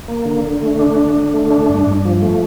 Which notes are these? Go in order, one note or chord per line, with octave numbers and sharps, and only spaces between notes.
A#3
D3
D3
A3
D4
D3
D3
A3
D4
G2
G2
F3
A3